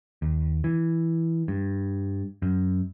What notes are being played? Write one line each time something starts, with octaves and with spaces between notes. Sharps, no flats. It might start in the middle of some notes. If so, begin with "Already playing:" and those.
D#2
E3
G2
F#2